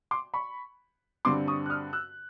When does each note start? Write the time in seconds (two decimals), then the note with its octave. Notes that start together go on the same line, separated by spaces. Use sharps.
0.11 C6 D6
0.34 B5 C#6
1.25 G2 D3 G3 C4 C6 D6
1.48 C#6 D#6
1.66 F#6
1.70 D#6 F6
1.93 E6 F#6